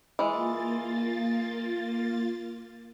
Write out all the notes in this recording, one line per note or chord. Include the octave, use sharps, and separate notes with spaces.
E3 G#3 A#3 F4 A6